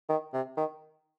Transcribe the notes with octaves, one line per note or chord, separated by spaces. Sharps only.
D#3
C3
D#3